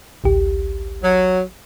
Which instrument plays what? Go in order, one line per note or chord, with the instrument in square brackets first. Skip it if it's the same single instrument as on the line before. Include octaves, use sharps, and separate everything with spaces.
[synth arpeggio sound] A1 D2 G4
[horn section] F#3